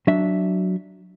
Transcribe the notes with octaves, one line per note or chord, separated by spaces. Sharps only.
F#3 D4 E5